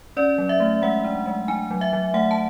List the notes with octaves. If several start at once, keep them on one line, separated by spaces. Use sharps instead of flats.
C#4 D5
F#3
E5
A3
G#3 F#5
D4
G#3
D4 G#5
F#3
E5
F#3
A3 F#5
A5